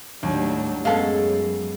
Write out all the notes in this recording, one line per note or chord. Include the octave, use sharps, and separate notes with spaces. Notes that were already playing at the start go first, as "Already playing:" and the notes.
D#2 A2 F#3 G3 D4
F#2 G#3 B3 C#4 A4 F5